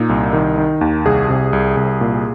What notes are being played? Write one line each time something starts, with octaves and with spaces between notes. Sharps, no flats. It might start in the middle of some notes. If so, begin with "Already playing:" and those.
Already playing: A#2 D#4
C2
D#3
D#3
D#2
C2 G#4
C3
C2
C2
A#2